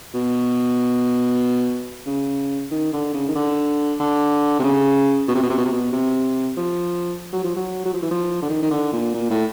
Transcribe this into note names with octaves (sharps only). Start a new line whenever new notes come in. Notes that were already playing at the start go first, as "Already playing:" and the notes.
B2
C#3
D#3
D3
C#3
D#3
D3
D3
C3
C#3
B2
C3
B2
C3
B2
C3
B2
C3
F3
F#3
F3
F#3
F#3
F3
E3
F3
D3
D#3
D#3
D3
A#2
A#2
A2